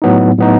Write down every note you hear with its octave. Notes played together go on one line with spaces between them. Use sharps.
A2 F#3 B3 D#4
A2 F#3 B3 D#4